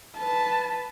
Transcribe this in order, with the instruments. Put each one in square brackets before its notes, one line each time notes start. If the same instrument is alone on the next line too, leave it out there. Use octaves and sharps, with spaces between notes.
[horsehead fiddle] B4 A5